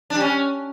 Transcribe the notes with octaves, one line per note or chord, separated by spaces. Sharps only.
D4
G3
C#4